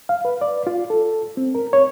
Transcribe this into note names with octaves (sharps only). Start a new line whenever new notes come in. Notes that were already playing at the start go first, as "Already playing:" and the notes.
F5
B4
D5
F4
A4
C4
A#4
C#5